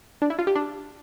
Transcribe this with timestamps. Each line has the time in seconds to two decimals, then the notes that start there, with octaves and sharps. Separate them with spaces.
0.22 D4
0.30 E4
0.39 F4
0.47 G4
0.55 D4